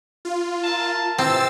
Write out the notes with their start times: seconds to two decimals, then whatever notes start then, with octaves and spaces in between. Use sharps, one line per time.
0.25 F4
0.64 A#4 E5 A5
1.18 C3 E3 C4 E6 A6